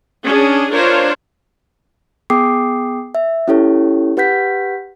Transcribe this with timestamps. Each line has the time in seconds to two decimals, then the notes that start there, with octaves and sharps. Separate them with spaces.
0.24 C#4 D4 G#4
0.72 D4 F4 A#4 C5 C#5
2.30 B3 G#4 G5 D6 D#6 C7
3.15 E5
3.48 C#4 E4 G4 A4 C#5
4.17 G4 B4 F#5 G6 B6